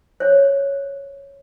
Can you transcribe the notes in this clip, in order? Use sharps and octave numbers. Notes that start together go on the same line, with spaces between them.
C5 C#5